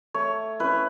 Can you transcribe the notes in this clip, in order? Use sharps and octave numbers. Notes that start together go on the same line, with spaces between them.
A3 C#5
C#4 E4 B4